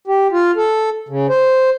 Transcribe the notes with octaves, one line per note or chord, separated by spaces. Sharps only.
G4
F4
A4
C#3
C5